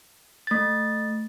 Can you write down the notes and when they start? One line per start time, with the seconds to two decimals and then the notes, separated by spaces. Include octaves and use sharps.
0.47 A3 A6